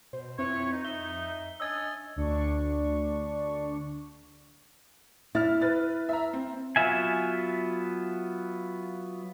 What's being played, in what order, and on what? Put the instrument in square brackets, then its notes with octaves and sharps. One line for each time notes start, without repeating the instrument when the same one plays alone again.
[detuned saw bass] B2 [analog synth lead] C5
[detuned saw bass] F2 [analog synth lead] C4 [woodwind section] E4 B4 C#5
[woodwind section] D#4
[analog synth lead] E5 [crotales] G7
[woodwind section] C#4 D4 D#5 [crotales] E6 G#6 A6
[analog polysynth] D2 D4 C#6
[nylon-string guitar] E4 [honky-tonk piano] F6 A6
[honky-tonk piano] B4 A6
E5 A#5
C4
[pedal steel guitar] F#3 B3 F4 E5 G#5